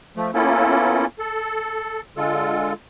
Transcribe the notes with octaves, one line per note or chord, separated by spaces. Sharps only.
F3 A3
A#3 B3 C#4 E4 F4 A4
A4
D3 G#3 F4 A4